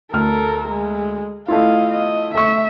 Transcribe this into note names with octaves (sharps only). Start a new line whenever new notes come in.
D2 A4 A#4 F6
G#3
A3 E4 F4 D#5 F5
D#5
A3 E5 C#6